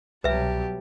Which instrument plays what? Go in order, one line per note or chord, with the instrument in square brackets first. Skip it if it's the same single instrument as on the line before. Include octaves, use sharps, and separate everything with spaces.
[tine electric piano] C2 [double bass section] B2 F#3 G3 [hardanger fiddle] G4 A5 [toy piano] B4 E5